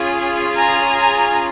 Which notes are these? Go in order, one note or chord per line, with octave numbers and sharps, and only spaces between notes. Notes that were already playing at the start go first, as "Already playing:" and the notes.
Already playing: C#4 F4 G#4
G#5 A#5